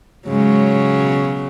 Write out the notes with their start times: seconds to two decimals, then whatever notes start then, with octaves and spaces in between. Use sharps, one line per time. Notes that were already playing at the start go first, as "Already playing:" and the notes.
0.28 G#2 C#3 F#3 G#3
1.00 B2